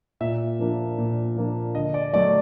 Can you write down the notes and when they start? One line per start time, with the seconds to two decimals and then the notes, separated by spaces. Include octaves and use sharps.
0.20 A#2 E5
0.59 F3 A#3 D4
0.98 A#2
1.36 F3 A#3 D4
1.75 D3 D#5
1.94 D5
2.13 F#3 A3 D5